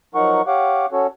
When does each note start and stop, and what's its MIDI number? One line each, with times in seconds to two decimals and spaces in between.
0.15 0.42 53
0.15 0.42 54
0.15 0.42 63
0.15 0.42 70
0.15 0.42 78
0.15 0.42 85
0.47 0.86 67
0.47 0.86 73
0.47 0.86 77
0.47 0.86 78
0.47 0.86 86
0.92 1.07 61
0.92 1.07 66
0.92 1.07 69
0.92 1.07 73